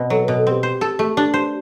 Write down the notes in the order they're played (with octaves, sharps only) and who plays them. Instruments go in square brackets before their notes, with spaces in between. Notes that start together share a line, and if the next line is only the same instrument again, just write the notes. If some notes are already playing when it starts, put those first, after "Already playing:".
Already playing: [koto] B2 C4
[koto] F#3 [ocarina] A4
[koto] B2 [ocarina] B4
[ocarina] A4
[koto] C4 [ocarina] G4
[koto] C5
A4
A3
D4
C5